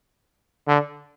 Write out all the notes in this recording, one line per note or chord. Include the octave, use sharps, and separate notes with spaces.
D3